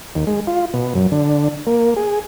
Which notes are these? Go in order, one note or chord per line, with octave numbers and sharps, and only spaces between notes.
D#2
G#3
F4
B2
F#2
D3
A#3
G#4